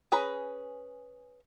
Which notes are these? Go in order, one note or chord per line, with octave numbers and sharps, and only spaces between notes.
C#4 G#4 B4 A#5